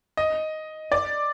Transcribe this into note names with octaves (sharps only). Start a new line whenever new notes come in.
D#5
D5